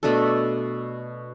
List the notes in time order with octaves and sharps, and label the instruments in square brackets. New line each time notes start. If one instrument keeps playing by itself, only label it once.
[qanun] B2 A3 D4 A4